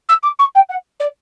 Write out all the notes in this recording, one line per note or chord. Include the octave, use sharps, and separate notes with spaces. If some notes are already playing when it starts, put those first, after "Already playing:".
E6
D6
C#6
G5
F#5
D5